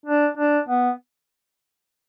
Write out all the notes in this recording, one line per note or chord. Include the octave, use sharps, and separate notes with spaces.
D4
D4
B3